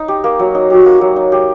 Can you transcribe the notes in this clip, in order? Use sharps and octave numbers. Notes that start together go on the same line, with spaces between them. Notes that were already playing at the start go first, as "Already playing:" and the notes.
Already playing: D#4
G4
A#3
F#3
D#4
F#4 G4
A#3
F#3
D#4
G4